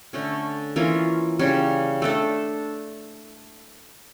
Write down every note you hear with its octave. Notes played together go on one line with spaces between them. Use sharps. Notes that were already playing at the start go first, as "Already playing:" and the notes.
D3 A3 C#4
E3 A#3 C#4 F4
C#3 G3 C#4
A3 D4 A4